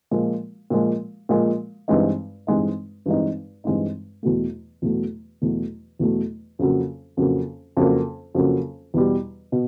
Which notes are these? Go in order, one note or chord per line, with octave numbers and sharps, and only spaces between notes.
A#2 F3 G#3
A#2 F3 G#3
A#2 F3 G#3
G2 E3 G#3 C4 D#4
G2 E3 G#3 C4 D#4
G2 E3 G#3 C4 D#4
G2 E3 G#3 C4 D#4
E2 B2 F#3 A3
E2 B2 F#3 A3
E2 B2 F#3 A3
E2 B2 F#3 A3
F2 C#3 F#3 A#3
F2 C#3 F#3 A#3
F2 C#3 F#3 A#3
F2 C#3 F#3 A#3
E2 B2 G3
B2